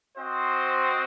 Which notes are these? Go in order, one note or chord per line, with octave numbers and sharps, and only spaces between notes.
C4 F#4 C5 D#5